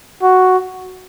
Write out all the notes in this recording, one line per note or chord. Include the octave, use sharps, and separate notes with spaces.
F#4